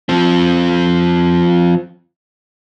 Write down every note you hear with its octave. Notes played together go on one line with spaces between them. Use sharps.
F3 C4